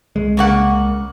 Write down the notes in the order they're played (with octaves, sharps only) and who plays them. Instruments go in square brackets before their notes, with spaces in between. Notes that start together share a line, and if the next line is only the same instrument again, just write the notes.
[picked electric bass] C2 G#3
[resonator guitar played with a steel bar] C#3 A#3 F#5